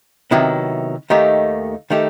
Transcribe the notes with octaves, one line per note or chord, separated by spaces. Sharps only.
C3 D#3 F#3 B3 E4
D#2 D#3 A3 D#4 G4
D#3 A3 D#4 G4